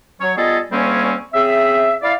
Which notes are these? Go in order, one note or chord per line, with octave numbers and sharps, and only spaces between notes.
F#3 C#5
G3 B3 F4 G#4 A4 D#5
D2 G3 A#3 C4 C#4
C#3 C4 G#4 E5
E4 D5 F5